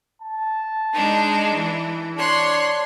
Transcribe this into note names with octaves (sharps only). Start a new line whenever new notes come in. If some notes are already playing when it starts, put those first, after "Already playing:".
A5
G#3 D4 D#4
E3
D4 C#5 C6 F#6